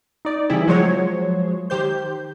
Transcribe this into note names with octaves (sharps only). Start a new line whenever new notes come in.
D#4 D5
C#3 E3 G3 C4 E4 G#4
F3 F#3 G#3 C5 C#5
D#3 G4 C5 G6